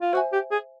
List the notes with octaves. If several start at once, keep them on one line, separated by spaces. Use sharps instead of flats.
F4
F#4 C5 E5 G#5
G4
G#4